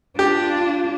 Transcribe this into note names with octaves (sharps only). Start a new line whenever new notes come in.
D4 F4 G4